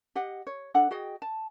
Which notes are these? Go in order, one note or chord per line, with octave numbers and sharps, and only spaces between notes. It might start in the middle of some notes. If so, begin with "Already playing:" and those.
G4 D#5 F#5
C#5
D4 A4 F#5
F#4 G#4 D#5 G5
A5